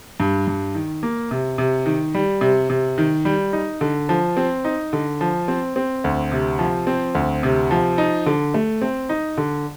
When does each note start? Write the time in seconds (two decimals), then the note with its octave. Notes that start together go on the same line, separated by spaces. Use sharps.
0.20 G2
0.47 G2
0.75 D#3
1.03 A#3
1.31 C3
1.58 C3
1.86 D#3
2.15 G3
2.41 C3
2.70 C3
2.98 D#3
3.25 G3
3.53 D#4
3.81 D3
4.09 F3
4.37 C4
4.65 D#4
4.93 D3
5.21 F3
5.48 C4
5.76 C4
6.04 D2
6.32 C3
6.59 F3
6.87 C4
7.15 D2
7.43 C3
7.71 F3
7.98 D#4
8.26 D3
8.54 A3
8.82 C4
9.09 D#4
9.38 D3